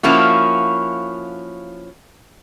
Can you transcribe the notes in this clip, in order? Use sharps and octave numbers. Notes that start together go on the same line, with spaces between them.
F3 A#3 C#4 E4 F#4